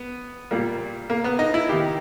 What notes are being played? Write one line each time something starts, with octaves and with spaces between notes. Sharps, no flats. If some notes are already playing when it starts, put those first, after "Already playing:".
Already playing: B3
A#2 G3 A#3
A#3
B3
D#4
E4
D#3 A#3 G4